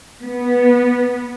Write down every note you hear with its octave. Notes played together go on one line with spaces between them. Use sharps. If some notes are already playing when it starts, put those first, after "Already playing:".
B3